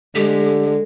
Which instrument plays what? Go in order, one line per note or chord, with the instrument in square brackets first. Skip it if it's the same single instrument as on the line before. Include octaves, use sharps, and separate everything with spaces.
[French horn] D3 [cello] G#3 [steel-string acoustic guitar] A3 [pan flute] G4